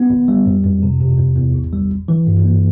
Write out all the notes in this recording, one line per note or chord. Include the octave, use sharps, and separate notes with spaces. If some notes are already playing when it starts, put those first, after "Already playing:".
Already playing: B3
G1
G3
F2
F2
C3
C3
E2
E2
A1
G3
G1
E3
G2
A#3